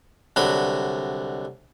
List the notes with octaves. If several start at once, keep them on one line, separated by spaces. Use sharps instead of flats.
C2 D3 F#3 B5